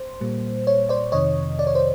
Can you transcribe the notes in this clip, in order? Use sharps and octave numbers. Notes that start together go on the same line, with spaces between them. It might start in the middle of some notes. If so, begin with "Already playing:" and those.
Already playing: C5
A#2 G3 A#3
C#5
C5 D5
F2 C3 D#3 C#5 D#5
D5
C#5
C5 D5